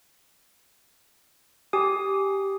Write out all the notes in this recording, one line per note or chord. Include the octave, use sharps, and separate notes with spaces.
G4 G#5 D#6